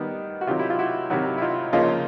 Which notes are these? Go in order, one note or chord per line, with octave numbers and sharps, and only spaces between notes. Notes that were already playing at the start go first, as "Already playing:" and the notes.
Already playing: D#3 G3 B3
F#4
C3 D#3 F#3 F4 G4
E4
F4
E4 F#4
C3 D#3 F#3 E4 F#4
E4
D#4 F4
C#3 F3 A#3 C#4 D#4 F4